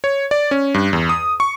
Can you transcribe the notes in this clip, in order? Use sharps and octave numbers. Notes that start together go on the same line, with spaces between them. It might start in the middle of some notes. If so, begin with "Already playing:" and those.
C#5
D5
C#4
G2
E2
D#6
C#6